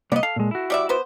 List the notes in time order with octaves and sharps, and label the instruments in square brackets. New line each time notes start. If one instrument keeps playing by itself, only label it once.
[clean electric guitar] C2 A#3 B3 [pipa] D5 D#5
[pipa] A4 [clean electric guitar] F5
[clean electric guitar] A#2 G#3
E4 F#4
[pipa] G3 D5 E5
B3 B4 C5